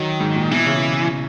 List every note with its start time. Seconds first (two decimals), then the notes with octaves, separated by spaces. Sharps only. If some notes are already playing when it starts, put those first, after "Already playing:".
Already playing: D#3 F#3
0.20 G#2
0.36 A#2
0.51 B2 E3
0.66 C#3